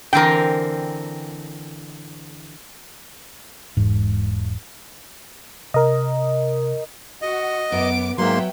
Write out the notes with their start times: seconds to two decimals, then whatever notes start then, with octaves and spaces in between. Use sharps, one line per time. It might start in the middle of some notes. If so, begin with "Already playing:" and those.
0.13 D3 E3 C4 A#4 G5
3.77 E1 G#2
5.74 C3 A#4 D#5
7.22 F#4 D#5
7.72 F#2 B3 D6 D7
8.18 G#2 F#3 A#3 B3 E5 G5 C6